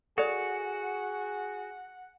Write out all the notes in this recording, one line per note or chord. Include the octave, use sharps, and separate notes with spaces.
F#4 G#4 A4 D5 F#5